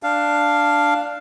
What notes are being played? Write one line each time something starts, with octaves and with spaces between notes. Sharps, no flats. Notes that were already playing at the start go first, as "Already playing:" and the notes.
D4 F5